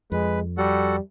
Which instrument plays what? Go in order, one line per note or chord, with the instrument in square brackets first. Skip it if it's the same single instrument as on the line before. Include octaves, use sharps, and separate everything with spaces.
[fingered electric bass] F2 [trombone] G#3 [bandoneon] B4
[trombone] G3 [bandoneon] F#4 A4 F#5